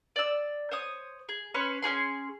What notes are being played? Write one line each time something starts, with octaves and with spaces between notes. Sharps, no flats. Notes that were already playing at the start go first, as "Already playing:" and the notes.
D5 E6
C5 C#5 D#6
G#4
C#4 B4 C#5 C6
C#4 F#4 G#4 C6